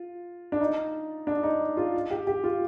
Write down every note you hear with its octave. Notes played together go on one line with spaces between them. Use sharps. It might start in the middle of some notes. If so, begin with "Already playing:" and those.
Already playing: F4
D4
D#4
D4
D#4
F4
G4
G4
F4